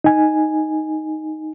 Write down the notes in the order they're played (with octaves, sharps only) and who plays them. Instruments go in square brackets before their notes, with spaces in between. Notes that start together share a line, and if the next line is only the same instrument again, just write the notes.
[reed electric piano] D#4 G#5